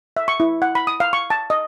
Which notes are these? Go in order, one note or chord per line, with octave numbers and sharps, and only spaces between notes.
E5
C#6
E4
F#5
B5
D#6
F5
C#6
A5
D#5